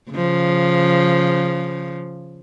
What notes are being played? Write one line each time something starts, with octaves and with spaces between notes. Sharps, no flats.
C#3 F3